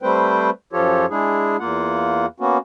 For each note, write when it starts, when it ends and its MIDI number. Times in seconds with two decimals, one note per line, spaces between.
0.03 0.50 55
0.03 0.50 57
0.03 0.50 60
0.03 0.50 71
0.03 0.50 72
0.03 0.50 79
0.73 1.06 42
0.73 1.06 53
0.73 1.06 65
0.73 1.06 67
0.73 1.06 69
0.73 1.06 73
1.10 1.57 56
1.10 1.57 62
1.10 1.57 64
1.10 1.57 68
1.60 2.26 40
1.60 2.26 58
1.60 2.26 65
1.60 2.26 78
2.40 2.58 58
2.40 2.58 59
2.40 2.58 61
2.40 2.58 66